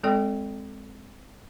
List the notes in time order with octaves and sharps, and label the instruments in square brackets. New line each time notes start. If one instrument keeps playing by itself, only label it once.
[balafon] G#3 C4 A4 D5 G5